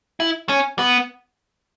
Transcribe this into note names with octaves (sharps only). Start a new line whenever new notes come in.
E4
C#4
B3